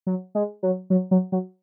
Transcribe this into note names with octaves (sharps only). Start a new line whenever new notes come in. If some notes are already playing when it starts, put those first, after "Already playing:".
F#3
G#3
F#3
F#3
F#3
F#3